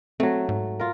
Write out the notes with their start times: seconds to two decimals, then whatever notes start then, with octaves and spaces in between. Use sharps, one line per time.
0.20 F#3 A3 C4
0.49 G#2
0.80 F4 A#4